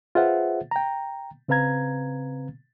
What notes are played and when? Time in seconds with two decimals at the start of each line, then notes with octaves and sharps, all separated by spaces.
0.15 F4 G#4 B4 C5 E5 F#5
0.71 G5 A#5
1.48 C#3 C4 B4 F5 A#5 G#6